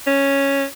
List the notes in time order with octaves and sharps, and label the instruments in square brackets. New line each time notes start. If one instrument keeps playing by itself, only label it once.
[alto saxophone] C#4